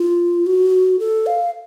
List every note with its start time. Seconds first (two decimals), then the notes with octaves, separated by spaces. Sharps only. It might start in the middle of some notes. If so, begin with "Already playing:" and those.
Already playing: F4
0.46 F#4
0.99 A4
1.26 F5